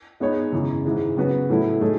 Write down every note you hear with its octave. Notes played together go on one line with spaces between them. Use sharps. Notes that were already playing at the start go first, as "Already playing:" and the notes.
G#3 B3 D#4 G#4 C#5
F#2 C#3 E3
G#2 E3 G#3
C#3 F#3 B3 F#4 B4
A2 F#3 A3 E4
A2 F#3 A3 D#4 G#4